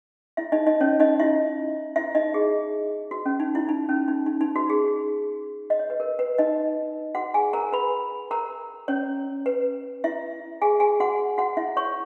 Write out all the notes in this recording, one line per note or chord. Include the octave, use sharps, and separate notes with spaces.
E4 E5
D#4 D#5
D#4 D#5
C#4 C#5
D#4 D#5
E4 E5
E4 E5
D#4 D#5
G#4
F#4
C#4
D#4
E4
D#4
C#4
D#4
D#4
D#4
F#4
G#4
D#5
C#5
B4
A#4
B4
D#4 D#5
F#4 F#5
G#4 G#5
A#4 A#5
B4 B5
A#4 A#5
C#4 C#5
B4
E4 E5
G#4 G#5
G#4 G#5
F#4 F#5
F#4 F#5
E4 E5
C#5 C#6